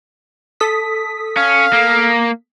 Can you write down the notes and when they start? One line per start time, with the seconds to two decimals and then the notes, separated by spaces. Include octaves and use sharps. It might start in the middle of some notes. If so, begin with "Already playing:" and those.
0.60 A4 D#6 B6
1.37 C#4 F5
1.73 A#3